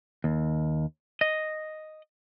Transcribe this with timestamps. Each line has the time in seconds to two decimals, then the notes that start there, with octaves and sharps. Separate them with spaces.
0.24 D#2
1.21 D#5